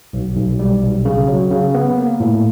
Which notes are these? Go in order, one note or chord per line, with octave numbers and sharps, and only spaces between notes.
B1
B1
G3
B1
C#3
F#3
C#3
B3
A#3
A2